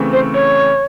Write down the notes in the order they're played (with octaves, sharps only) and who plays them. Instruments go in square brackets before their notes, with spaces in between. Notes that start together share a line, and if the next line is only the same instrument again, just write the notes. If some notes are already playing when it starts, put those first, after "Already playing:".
Already playing: [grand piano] C#3 E3 A3 C4
[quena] C5
C#5